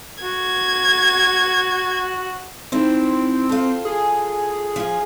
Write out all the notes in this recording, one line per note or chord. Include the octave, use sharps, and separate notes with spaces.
F#4 G#6
D#3 C4 E4
F4 A4
G#4
F3 F4